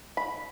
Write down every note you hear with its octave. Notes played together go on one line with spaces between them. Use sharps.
B5